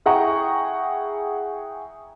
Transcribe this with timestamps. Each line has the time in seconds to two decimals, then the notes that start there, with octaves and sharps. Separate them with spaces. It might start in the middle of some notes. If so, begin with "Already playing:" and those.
0.06 E4 G#4 F#5 G5 A#5 C#6